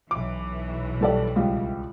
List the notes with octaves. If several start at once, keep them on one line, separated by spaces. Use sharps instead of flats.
B1 E3 D6
G3 A4 D5
C#2 G3